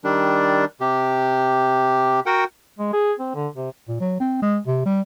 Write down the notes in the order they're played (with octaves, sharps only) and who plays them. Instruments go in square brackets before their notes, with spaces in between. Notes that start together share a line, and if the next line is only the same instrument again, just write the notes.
[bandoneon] D#3 G3 D4
C3 G4
F#4 A#4 F#5 G5
[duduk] G#3
G#4
C4
D3
C3
[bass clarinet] A#2
F#3
C4
G#3
C3
G3